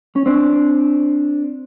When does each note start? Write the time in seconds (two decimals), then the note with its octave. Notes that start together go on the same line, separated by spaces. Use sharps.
0.16 C#4
0.26 C4 D4